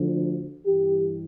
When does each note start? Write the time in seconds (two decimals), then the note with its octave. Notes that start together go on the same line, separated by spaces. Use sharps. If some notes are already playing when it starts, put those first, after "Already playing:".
Already playing: D2 D3 F3
0.66 G2 E3 G4